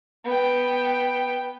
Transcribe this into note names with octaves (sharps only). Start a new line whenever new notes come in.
B3 G5